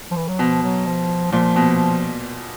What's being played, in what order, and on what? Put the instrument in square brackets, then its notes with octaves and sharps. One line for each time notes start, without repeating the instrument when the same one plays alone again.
[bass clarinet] F3
E3
F#3
[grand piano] B2 [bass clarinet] F3
[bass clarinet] F#3
F3
[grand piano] A#2 [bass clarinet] F3
[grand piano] B2